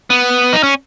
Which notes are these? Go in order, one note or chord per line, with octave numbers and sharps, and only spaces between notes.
B3
D#4
C#4